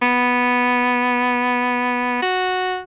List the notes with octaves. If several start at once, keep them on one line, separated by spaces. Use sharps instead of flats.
B3
F#4